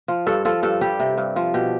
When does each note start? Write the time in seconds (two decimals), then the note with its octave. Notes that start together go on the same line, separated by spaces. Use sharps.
0.08 F3
0.27 G2 A4
0.45 F3 A4
0.63 G2 A4
0.81 G3 G4
1.00 C3
1.18 G2
1.36 F3
1.54 B2 G4